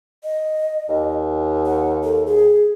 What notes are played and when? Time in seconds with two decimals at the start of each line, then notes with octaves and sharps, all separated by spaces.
0.24 D#5
0.88 D#2
1.66 F#5
2.04 A4
2.26 G#4